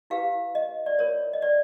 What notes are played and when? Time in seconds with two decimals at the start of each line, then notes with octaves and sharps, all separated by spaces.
0.10 E4 G4 B4 F5
0.55 D#5
0.86 D5
0.99 F4 A#4 C#5
1.33 D#5
1.42 D5